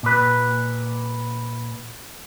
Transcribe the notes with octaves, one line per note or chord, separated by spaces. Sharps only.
A#2 B4